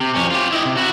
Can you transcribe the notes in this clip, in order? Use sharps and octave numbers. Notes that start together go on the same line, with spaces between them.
C3
F2 C#4
F4 G4
E4 D#5
C3
E4 F#4